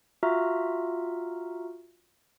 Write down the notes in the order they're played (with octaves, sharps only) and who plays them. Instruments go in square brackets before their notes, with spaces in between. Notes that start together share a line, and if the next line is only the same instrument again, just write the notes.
[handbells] F4 F#4 E5 A#5 F6